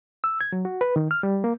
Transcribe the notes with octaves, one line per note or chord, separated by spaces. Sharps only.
E6
G#6
F#3
F#4
B4
D#3
F6
G3
A#3